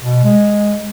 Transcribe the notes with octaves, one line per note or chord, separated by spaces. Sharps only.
B2
G#3